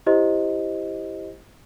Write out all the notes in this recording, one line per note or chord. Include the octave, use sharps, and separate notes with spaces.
E4 G4 C5 D#5